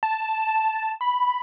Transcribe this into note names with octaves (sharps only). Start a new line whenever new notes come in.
A5
B5